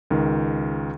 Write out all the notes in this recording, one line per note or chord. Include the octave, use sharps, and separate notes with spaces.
C#2 D#3